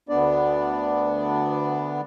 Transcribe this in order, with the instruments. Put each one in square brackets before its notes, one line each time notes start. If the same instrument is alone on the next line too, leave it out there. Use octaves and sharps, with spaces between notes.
[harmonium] D2 B3 D4 D5